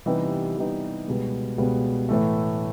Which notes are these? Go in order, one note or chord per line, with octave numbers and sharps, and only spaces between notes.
C3 E3 G3 B3 D#4
C3 E3 G3 B3 D#4
C#2 B2 G3 B3
C#2 B2 G3 B3
A2 E3 A3